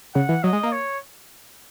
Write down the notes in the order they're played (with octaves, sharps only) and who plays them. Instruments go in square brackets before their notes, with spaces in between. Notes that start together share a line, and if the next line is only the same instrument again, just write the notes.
[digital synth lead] C#3 [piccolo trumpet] F#5
[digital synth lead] E3
[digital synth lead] F#3 [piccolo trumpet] D#5
[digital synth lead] G#3
A#3
[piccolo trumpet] C#5